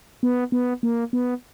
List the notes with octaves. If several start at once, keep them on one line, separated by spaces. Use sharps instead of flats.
B3
B3
A#3
B3